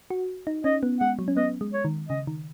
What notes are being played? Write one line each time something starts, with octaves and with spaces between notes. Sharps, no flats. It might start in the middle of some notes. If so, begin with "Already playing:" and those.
F#4
D#4
C#4 D#5
B3
G#3 F#5
F#3
C#4
B3 D#5
G#3
C#5
D#3
C#3 D#5
D#3